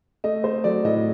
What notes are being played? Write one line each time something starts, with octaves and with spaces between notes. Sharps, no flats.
A3 D#5
A3 C5
F#3 D5
A2 D#5